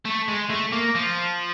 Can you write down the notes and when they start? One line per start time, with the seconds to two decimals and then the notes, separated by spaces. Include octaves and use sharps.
0.05 A3
0.28 G#3
0.50 A3
0.72 A#3
0.95 F3